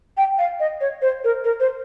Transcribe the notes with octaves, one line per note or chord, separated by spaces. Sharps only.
G5
F5
D#5
C#5
C5
A#4
A#4
C5